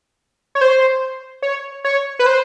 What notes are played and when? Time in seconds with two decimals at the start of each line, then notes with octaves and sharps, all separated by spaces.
0.55 C#5
0.61 C5
1.42 C#5
1.84 C#5
2.19 B4
2.26 C5